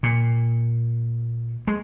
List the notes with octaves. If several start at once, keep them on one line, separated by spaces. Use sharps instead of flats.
A#2
G#3